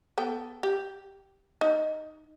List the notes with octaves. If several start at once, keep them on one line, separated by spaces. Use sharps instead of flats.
B3 A4 G5
G4
D#4